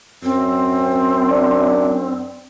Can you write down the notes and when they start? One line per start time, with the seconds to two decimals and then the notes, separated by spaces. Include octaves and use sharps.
0.23 F#2 C4
1.31 D4